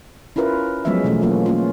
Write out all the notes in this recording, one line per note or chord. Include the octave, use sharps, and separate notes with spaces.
C#4 E4 F4 A#4 B4
F3 F#3 G#3 B3 C#4 E5
B2 E3 A3 C#4
F#3 A#3 C#4 F4
A#3 C#4 F4